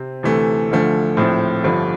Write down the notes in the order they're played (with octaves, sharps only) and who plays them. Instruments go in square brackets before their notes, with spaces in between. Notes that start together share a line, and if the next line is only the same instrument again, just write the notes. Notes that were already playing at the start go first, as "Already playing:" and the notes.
Already playing: [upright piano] C3 C4
D2 C3 E3 A3
D2 D3 F3 A3
A#1 A2 F3 C4
G1 G2 D3 F3